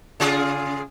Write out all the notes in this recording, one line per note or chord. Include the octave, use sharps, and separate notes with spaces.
C#3 F4 G#4